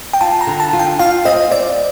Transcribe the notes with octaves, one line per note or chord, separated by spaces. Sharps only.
G5
F4 A5
A#5
D3
A5
F4
G5
F4 F5
C4 D#5
C4 D5